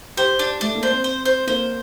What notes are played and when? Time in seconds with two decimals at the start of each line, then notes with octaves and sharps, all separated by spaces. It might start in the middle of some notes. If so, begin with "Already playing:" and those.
0.17 G4 C5
0.39 D4
0.61 A3 D4
0.75 A#3
0.83 C5
0.90 C4
1.04 C5
1.25 C5
1.47 A#3 C5